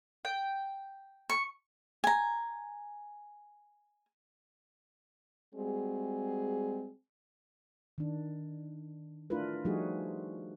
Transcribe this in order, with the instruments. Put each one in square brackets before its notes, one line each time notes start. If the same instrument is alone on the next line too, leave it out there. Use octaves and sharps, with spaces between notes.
[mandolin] G5
[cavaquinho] C#6
G#5 A#5
[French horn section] G3 G#3 C4 F#4 G#4
[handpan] D#3 D4
A3 D4 E4 F4 A#4 B4
F3 G3 A3 D#4 F#4 G#4